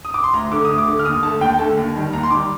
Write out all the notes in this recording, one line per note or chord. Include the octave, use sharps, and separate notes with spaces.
D#6
D6
C6
D2 A#5
D3 A3 D6
D#6
D2
D6
D3 A3
F6
D#2 D#6
D3 A3 A5
D#2 G5
D3 A3 A5
D#2
D#3 G3
D#2 A#5
C6
D#3 G3 D6